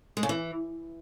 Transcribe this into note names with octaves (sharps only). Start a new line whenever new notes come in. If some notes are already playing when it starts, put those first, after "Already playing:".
G#3
C#3
E3